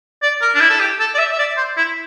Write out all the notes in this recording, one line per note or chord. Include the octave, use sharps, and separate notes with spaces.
D5
A#4
D4
E4
A4
G4
A4
D5
E5
E5
D5
C5
E4